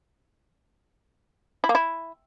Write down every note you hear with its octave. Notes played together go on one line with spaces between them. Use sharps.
E4
A#3
E4